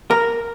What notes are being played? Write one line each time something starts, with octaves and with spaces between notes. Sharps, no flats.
A#4